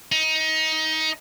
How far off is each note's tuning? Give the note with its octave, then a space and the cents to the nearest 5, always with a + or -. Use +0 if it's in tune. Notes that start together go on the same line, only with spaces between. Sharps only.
D#4 +20